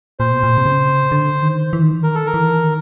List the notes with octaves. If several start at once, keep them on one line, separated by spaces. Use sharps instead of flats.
A#2 C5
B2
A#2
C3
C#3
D3
D#3
E3
D#3
E3
D#3 A#4
A4
A#4
E3
D#3